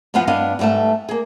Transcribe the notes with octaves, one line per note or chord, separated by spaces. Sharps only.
E2 F3 B3 F4 F#5
G2 B3 D4 D#5 F5
G#2 G3 A3 B3 A5
A#3 G#4